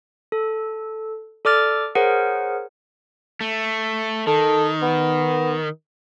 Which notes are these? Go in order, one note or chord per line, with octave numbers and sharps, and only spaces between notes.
A4
A4 D5 D6 F6 A6
G#4 A#4 C5 C#5 F#5
A3
D#3 A4
B3